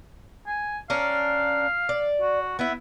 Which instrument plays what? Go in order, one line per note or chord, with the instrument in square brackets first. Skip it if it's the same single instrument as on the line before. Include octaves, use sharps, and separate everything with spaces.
[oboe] G#5
[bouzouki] C#4 D4 A#4 [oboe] F5
[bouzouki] D5
[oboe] F#4
[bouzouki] B3 E5 [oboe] E4